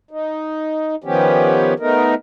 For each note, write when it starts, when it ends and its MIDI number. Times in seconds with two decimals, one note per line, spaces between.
0.11 0.95 63
1.04 1.74 51
1.04 1.74 53
1.04 1.74 59
1.04 1.74 61
1.04 1.74 67
1.80 2.15 57
1.80 2.15 59
1.80 2.15 63
1.80 2.15 70